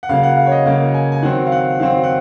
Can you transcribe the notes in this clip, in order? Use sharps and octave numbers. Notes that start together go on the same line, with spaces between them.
F#5
C#3 F#3 A#3 F5
F#5
F5
C#5
D#5
C#3 F#3 A#3 F5
G#5
G#5
D#3 F#3 C4 F#5
F5
F#5
D#3 F#3 C4 F5
F#5